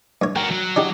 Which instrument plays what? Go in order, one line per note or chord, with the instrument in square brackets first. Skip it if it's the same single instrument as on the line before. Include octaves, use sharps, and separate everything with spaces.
[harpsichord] G2 C#5
[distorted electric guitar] F#4 A#4 [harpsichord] G5
[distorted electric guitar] F#3
[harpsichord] D4 D#4 G4